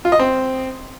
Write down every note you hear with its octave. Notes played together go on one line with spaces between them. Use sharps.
F4
D#5
C4